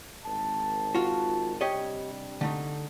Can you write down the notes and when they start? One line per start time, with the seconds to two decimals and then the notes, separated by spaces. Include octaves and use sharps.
0.24 G#1 D#3 A5
0.95 F4 F#4
1.61 C3 G3 D4 G4 C#5 D#5
2.41 D3 A3 D#4